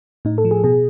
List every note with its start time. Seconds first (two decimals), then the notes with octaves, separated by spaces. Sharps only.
0.25 A2 D#4
0.38 A4
0.45 F3
0.51 G#4
0.64 B2 G#4